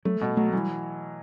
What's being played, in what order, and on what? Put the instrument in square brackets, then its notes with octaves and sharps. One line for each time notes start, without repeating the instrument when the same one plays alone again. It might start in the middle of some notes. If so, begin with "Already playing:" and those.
[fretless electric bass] F#3 [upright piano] A3
[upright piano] B2 [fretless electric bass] G3
[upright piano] F#3 [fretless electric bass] A3
[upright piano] E3 [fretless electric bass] G3